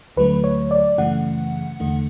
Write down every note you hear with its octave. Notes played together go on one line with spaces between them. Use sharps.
D2 D3 F#3 A3 B4
C#5
D5
F#2 C#3 E3 A3 F#5
E2 D3 A3